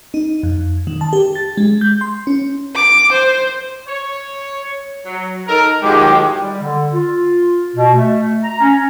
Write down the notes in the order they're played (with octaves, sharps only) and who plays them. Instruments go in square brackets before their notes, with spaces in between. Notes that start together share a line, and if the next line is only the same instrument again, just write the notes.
[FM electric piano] D#4
F2
D#3
A5
G4
A6
G#3
G6
C6
C#4
[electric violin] D6
C5
[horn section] C#5
F#3
D#4 A4 A#4
[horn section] A2 F3 G#3 [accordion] D#3 F#3 G4
[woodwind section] G3
D3
F4
B2
A3
A#5
C#4